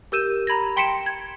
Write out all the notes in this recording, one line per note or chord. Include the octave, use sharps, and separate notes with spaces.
G4 A#4 E6 G6 D#7 E7
A#5 B5 G#6 A#6
G5 C6 B6 C#7 D7 E7
G#6